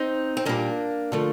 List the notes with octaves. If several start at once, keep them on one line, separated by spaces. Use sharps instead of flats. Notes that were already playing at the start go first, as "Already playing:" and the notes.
Already playing: C4 D#4
C4
A#2 G3 A#3 D4
D3 F3 A3